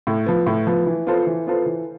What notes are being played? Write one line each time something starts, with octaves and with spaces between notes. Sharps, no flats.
A2
F3 B3
A2
F3 B3
E3
B3 F4 A4 C5
E3
B3 F4 A4 C5
E3